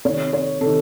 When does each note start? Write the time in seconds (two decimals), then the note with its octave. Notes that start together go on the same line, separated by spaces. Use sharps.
0.05 C3 D#3 C#5
0.33 C#5
0.61 C3 D#3 A4